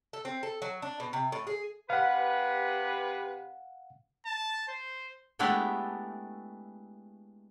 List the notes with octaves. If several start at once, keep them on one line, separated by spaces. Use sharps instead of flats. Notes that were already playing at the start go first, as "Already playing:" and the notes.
A4
C4
A4
F#3
D4
B2
C3
A2
G#4
C3 G4 B4 F5 F#5
A5
C5
G#3 A3 B3 D4 E4 G4